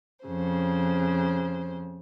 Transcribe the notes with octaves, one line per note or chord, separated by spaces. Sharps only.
F2 C#3 C5